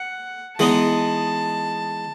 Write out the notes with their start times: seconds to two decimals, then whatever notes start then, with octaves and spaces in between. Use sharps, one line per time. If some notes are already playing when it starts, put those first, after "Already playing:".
Already playing: F#5
0.59 E3 G#3 B3 D#4 A5